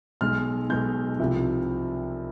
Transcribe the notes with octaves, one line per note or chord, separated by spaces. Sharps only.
B1 B2 G#3 F6
B1 B2 G#3 G6
C2 C3 F3